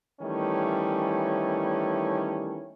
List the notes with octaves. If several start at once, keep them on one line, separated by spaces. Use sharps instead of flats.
D#3 E3 G3 A3 C#4